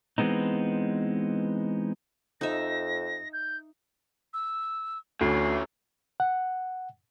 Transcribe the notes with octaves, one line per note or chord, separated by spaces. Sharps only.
E3 G#3 B3 C4 D#4
F2 D#4 E5 A#6
G6
E6
D2 A3 C#4 C7
F#5